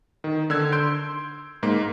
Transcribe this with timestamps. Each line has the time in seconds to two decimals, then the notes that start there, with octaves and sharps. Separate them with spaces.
0.24 D#3
0.50 D3 E6 G#6
0.72 C6 G6 D7
1.63 G#2 A#3